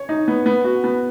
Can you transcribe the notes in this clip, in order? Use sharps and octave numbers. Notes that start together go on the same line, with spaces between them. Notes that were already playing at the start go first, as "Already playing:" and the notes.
Already playing: C#5
D#4
B3
B3
F#4
B3